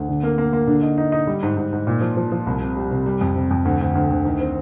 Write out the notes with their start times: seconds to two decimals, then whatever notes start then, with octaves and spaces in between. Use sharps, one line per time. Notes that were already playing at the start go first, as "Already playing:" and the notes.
Already playing: D2
0.08 D3
0.23 A#3
0.38 A#3
0.53 A#3
0.67 D3
0.82 D#4
0.98 D#4
1.12 D#4
1.27 G3
1.43 G#2
1.57 G#2
1.72 G#2
1.87 A#2
2.01 F3
2.17 F3
2.32 F3
2.47 C2
2.61 C3
2.76 G3
2.91 C3
3.06 G3
3.21 F2
3.36 C3
3.51 F2
3.65 D2
3.81 D2
3.95 D2
4.10 D2
4.25 D#3
4.40 C4